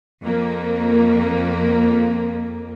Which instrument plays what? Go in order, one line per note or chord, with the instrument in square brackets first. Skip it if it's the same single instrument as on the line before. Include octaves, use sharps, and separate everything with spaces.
[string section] F2 A#3